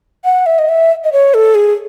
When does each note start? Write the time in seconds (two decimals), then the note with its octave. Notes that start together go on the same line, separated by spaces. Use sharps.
0.25 F#5
0.46 E5
0.59 D#5
0.69 E5
1.04 D#5
1.12 C#5
1.34 A4
1.55 G#4